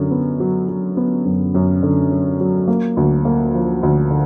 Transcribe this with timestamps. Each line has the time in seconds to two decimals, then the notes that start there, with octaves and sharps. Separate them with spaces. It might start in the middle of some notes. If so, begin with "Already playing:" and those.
Already playing: F#2 D3 F#3
0.11 B3
0.40 F#3
0.69 F#3
0.97 B3
1.25 F#2
1.55 F#2
1.83 D3
2.11 F#3
2.40 F#3
2.68 A#3
2.97 D2
3.25 A#3
3.54 F3
3.83 D2
4.11 D3